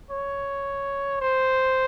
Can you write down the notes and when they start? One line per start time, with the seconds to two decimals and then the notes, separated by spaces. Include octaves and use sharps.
0.11 C#5
1.21 C5